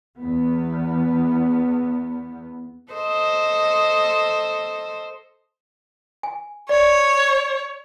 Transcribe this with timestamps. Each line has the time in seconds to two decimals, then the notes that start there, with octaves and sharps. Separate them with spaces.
0.19 E2 B3
2.92 A4 C5 D#5
6.23 G#5
6.69 C#5 D5